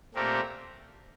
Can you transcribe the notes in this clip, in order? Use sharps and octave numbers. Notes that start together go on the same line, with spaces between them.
A#2 A3 C4 G4 A#4